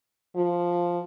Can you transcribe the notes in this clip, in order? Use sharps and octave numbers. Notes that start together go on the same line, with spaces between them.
F3